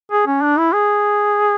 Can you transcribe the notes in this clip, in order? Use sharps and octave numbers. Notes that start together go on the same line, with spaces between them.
G#4
C#4
D4
E4
G#4